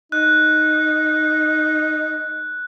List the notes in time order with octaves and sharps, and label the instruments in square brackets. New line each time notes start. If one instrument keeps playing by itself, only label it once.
[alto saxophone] D#4 [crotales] F#6